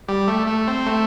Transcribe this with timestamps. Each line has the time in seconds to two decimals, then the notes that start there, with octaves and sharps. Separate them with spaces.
0.08 G3
0.28 A3
0.47 A3
0.67 C4
0.86 A3